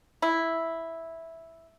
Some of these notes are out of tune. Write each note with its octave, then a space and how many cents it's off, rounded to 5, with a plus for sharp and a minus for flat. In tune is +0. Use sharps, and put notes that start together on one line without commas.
E4 -5